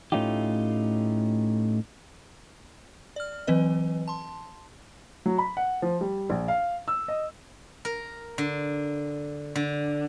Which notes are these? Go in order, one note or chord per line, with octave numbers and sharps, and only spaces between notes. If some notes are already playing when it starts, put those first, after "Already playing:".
A2 A3 C#4 D#4 F4 G4
D5 F6
E3 F#3 C4 B4 D#5
A5 C6
F#3
B5
F#5
F3
G3
A#1
F5
E6
D#5
A#4
D3
D3